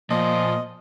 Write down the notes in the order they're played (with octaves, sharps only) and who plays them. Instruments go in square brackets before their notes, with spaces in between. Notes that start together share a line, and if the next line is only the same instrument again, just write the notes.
[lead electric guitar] A#2 [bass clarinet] F3 [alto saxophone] D#5